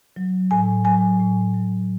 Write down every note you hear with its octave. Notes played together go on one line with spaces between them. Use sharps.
F#3
A2 G#5
F#3 G#5
A2
F#3